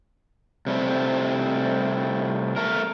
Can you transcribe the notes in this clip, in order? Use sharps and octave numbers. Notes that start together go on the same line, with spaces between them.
C3 G3 A3 C4
A3 A#4